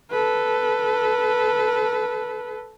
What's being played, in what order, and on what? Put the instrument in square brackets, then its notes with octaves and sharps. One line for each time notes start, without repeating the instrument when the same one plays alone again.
[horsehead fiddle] A4 B4